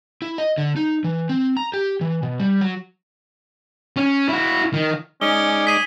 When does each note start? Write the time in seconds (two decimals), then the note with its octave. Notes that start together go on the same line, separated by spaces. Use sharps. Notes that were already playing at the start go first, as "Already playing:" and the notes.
0.22 E4
0.38 D#5
0.58 D3
0.76 D#4
1.04 E3
1.29 C4
1.57 A#5
1.74 G4
2.01 E3
2.23 B2
2.40 G3
2.61 F#3
3.97 C#4
4.29 E4 F#4
4.74 D#3
5.21 G#3 C#4 D#4 D5 G7
5.67 G#4 B6 D#7